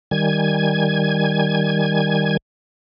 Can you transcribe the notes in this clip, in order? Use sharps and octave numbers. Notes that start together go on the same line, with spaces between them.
D#3 G3 G#5 G#6